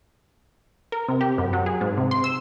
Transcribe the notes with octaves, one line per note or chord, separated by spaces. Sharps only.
A#4
C3
G4
F#2
F#3
G#4
G#2
C3
C6
E6